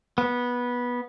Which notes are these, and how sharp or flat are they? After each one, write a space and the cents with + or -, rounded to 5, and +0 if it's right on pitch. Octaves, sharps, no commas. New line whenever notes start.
B3 -15